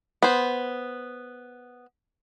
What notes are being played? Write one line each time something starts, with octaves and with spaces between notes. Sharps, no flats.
B3 C5